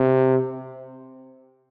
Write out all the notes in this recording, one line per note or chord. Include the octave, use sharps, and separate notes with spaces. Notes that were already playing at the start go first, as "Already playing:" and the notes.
Already playing: C3